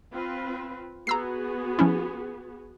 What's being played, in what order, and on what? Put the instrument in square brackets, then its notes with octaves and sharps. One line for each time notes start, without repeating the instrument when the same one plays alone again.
[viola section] C4 F4 B4
[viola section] B3 F#4 G#4 [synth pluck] A#5 E6 C7
[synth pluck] F3 C#4 E4